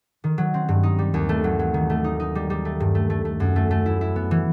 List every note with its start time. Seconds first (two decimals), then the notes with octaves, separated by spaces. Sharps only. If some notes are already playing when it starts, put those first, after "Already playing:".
0.24 D#3
0.38 F#3
0.54 C4
0.69 G2
0.83 D#4
0.99 G3
1.14 D#2
1.29 A3
1.44 F#3
1.59 F#3
1.74 D#3
1.90 A3
2.04 D#4
2.20 D#4
2.35 G3
2.50 G3
2.65 A3
2.80 G2
2.95 A3
3.10 A3
3.25 A3
3.40 F#2
3.56 A3
3.71 A3
3.86 E4
4.01 E4
4.16 B3
4.31 E3